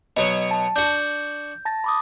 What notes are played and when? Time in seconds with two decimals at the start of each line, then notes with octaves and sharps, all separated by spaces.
0.17 B2 F#3 C#5 D#5
0.51 A5
0.76 D4 F#4 G6
1.65 A5 A6 A#6
1.84 B5 D6 D#6